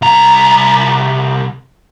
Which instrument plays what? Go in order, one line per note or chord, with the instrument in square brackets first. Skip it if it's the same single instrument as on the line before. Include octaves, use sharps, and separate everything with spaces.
[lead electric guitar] C2 A#5